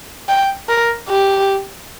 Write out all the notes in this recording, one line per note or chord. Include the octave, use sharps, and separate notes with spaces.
G5
A#4
G4